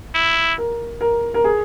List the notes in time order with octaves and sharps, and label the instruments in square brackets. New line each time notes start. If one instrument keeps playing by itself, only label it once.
[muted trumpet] E4
[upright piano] A#4
A#4
A#4
G#4